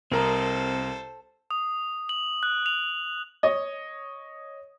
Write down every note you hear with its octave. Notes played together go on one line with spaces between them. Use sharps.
C2 C4 A4 A#4 C5 D#5 A#5
D#6
F#7
F#6
F7
C#5 D#5